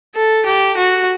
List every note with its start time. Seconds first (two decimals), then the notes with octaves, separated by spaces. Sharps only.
0.15 A4
0.46 G4
0.77 F#4